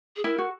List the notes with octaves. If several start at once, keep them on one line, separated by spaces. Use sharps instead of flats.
G#4
E4 A#4
F#4